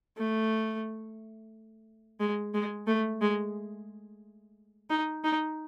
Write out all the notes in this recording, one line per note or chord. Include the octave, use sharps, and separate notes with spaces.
A3
G#3
G#3
A3
G#3
D#4
D#4